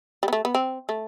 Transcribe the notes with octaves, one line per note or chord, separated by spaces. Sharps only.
G3
B3
A3
B3
C4
A3